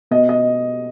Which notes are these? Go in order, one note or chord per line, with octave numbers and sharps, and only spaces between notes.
B2 D#5
D#5